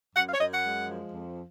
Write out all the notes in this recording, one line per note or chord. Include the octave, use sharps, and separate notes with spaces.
F#2 F#5
F5
C#5
F#2 D#5
F#5
G#3
F3
F2